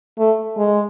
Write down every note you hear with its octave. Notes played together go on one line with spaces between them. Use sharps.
A3
G#3